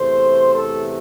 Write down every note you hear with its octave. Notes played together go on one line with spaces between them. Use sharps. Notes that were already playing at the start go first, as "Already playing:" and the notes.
Already playing: E2 C3 A3 C5
A4